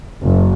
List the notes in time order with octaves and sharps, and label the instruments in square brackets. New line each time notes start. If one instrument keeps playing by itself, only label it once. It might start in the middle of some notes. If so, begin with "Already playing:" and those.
[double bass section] F#1